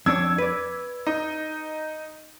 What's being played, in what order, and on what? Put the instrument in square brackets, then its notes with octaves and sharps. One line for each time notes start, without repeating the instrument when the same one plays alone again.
[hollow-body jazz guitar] F2 D4 C#5 [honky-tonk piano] E6 G#6
[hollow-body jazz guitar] B4 D5
[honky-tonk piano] D#4